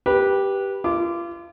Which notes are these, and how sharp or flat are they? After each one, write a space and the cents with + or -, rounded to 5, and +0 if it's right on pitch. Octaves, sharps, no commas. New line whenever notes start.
G4 +0 B4 -15
F4 -35 D6 +0